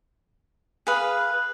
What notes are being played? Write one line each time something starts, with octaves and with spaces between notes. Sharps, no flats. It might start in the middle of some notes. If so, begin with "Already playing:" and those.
G#4 B4 F5